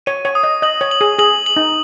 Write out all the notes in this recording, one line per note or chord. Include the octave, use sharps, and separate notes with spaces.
C#5 D#7
C#5
D#6
D#5
D#5 F#7
C#5
F#7
G#4
G#4 F#7
F#7
D#4